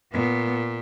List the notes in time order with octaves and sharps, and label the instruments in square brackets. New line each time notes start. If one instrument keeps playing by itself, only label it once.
[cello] A#2 [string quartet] B3